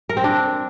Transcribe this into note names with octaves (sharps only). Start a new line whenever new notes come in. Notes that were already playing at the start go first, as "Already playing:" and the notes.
A#4
C4
D4